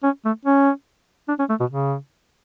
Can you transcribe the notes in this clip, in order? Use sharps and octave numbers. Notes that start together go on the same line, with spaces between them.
C#4
A3
C#4
D4
C#4
A3
B2
C#3